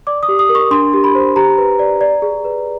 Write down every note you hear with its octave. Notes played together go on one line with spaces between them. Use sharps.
D5 D6
D#6
G4
D#6
A#4
C#6
D4 C6
G4
B5
C5
G4 A#5
B4
D5
D5
G#4
B4